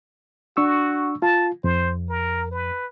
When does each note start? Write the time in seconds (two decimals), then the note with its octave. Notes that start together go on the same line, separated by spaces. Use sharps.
0.57 D4 F#4 C#6 E6
1.22 F4 A5
1.64 F2 C5
2.09 A#4
2.51 B4